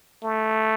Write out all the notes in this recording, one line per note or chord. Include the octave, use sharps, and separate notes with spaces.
A3